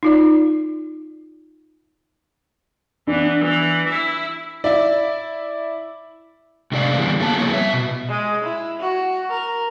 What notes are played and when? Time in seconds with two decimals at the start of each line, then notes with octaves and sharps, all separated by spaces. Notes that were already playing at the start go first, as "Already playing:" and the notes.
0.03 D#4 F4 D5
3.07 E3 B3 D4
3.41 E3
3.88 E4 E5
4.64 E4 D5 E5
6.72 A2 C3 G#3 D4 D5 F5
6.98 D3 E3 G3 G#3 B3
7.20 F#3 A3 A#3 G#4 A5
7.38 F3 A#3 B3 E4 C#5
7.52 G3 E5
7.73 B2
8.08 G#3
8.44 E4
8.79 F#4
9.30 A#4